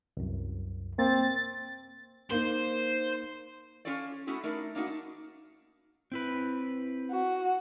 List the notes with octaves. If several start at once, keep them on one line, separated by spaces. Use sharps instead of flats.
C2 F#2
A#3 C4 A6
A#3 D#4 C5
C#4 F4 A4 C#5 D5
A3 B3 C#4 E4 F#4
A3 D4 D#4 A#4 D5
A#3 D4 D#4 F#4
D4
C4 E4 B4
F#4